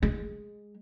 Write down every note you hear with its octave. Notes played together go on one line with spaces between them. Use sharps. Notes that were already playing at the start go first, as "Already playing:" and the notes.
G#3